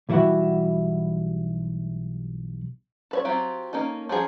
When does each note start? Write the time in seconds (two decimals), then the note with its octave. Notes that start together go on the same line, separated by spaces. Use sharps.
0.09 B1 E3 G3 E4 F#4 F#5
3.11 A4 B4 C#5
3.25 F#3 C4 F4 G4
3.73 A#3 C#4 D#4 A4
4.09 F3 F#3 C#4 G#4